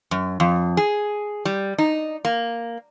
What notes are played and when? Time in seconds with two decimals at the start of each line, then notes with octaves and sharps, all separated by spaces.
0.11 F#2
0.40 F2
0.77 G#4
1.45 G3
1.78 D#4
2.25 A#3